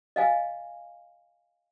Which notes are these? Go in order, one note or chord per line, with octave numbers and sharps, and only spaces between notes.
D#5 F5 G#5